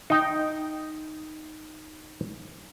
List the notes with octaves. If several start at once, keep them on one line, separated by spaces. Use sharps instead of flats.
D#4 G5